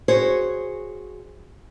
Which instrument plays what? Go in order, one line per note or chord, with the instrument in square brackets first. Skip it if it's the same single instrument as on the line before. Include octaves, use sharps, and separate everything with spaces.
[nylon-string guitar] F#4 G#4 C5 C#5